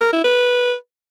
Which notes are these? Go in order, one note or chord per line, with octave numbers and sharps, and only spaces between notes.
A#4
E4
B4